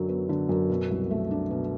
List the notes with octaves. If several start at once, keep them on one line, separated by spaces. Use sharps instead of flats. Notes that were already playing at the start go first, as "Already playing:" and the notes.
Already playing: F#2 D3 F#3
B3
D3
F#2
B2
C2
A3
D4
B2